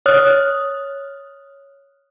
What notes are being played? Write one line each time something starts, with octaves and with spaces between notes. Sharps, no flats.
C#5 D#6 F6 F#6